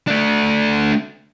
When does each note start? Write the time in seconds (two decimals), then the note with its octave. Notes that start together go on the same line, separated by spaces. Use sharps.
0.07 A3 D4